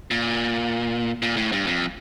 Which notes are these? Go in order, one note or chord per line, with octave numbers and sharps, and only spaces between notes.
A#2
A#2
A2
G2
F2